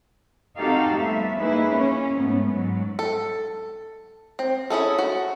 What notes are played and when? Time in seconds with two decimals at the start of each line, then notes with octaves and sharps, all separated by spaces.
0.58 C4 D#4 F#4 G4 A4 F5
0.95 F3 G3 A3 B3 E5
1.37 A#3 D#4 E4 G#4 B4
1.69 C#4
2.18 G#2 A3 B3
2.50 G#2 F#3
2.99 A4
4.39 C4
4.70 C#4 E4 G#4 A4
4.99 F#4